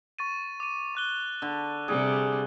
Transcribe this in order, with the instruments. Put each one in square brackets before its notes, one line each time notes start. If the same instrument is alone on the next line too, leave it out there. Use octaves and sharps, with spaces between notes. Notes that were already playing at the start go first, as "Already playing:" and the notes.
[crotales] C#6 A6 D#7
D6 D#7
C#6 F#6 G7
[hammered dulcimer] D3
[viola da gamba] C3 G3 [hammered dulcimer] G#4